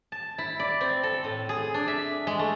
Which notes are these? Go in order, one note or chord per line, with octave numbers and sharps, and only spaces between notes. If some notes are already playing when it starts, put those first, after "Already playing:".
A5
E4
D5
C4
A4
A2
G#4
D4
E5
G#3
A3